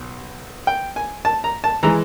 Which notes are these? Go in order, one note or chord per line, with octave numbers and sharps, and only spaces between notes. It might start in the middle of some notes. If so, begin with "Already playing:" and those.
Already playing: B1
G5
G#5
A5
A#5
A5
E3 G#3 A#5